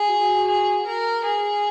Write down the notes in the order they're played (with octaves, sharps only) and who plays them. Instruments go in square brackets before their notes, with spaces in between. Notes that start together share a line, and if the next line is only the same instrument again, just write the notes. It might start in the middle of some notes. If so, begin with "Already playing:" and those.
Already playing: [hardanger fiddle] G#4
[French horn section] F#4
[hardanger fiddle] G#4
A#4
G#4